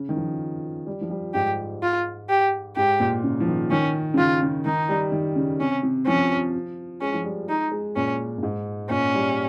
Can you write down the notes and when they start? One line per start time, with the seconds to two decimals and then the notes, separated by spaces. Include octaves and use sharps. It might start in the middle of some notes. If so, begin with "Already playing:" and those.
Already playing: C#3
0.09 D#3
0.16 F3
0.87 G3
1.01 F3
1.10 G3
1.34 G#2 G4
1.82 F4
2.29 G4
2.76 G#2 G4
3.00 A#2
3.24 C#3
3.40 F3
3.47 D#3
3.71 D#3 C#4
4.14 C#3
4.17 D#3 F4
4.42 C#3
4.65 D#3 D#4
4.89 G3
5.12 D#3
5.36 C#3
5.60 C3 C#4
5.83 C3
6.06 F3 C#4
7.01 G#3 C#4
7.14 F3
7.24 G3
7.49 G#3 D#4
7.72 G#3
7.96 A#2 C#4
8.38 A#2
8.43 G#2
8.90 A#2 C#4
9.14 G3